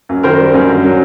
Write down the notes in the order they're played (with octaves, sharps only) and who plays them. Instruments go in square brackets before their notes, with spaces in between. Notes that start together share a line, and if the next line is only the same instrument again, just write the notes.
[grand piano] F#2
D#3 A#4 C5
G3
F#2
D3
F#3